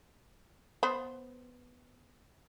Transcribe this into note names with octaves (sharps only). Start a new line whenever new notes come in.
B3 C5 B5